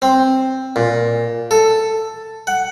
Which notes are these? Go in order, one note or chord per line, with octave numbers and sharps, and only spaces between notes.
C4
A#2
A4
F#5